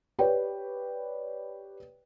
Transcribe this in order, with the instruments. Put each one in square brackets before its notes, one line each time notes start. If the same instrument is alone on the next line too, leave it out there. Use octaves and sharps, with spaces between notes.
[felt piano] G4 B4 C#5 D5 G5